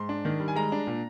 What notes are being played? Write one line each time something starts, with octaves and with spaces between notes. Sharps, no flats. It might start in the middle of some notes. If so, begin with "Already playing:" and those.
Already playing: G#2 C6
D4
D#3
G3
G#5
G#3 A#5
D4
A#2